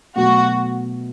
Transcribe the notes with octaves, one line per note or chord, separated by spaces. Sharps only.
B2 F#3 A3 F#4